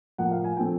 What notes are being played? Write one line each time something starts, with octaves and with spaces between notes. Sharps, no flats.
A2 F3 A#3 F#5
F5
G#5
A#2 F3 A3 C4 G5